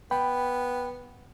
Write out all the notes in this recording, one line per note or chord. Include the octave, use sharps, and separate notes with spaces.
B3 G5 B5